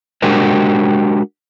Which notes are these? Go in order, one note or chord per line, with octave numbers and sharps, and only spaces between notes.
G#3 D4 F#4 G4 A#4 C5